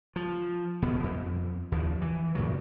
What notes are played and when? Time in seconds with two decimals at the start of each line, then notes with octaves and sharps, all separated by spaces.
0.16 F3
0.82 D#1 B2 B3
1.04 F2
1.72 D#2 F3
2.02 E3
2.35 F#2 A#2 C#3 F#3